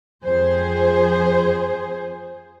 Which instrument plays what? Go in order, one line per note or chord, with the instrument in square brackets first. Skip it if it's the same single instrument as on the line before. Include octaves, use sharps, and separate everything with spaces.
[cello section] F2 G#4 C5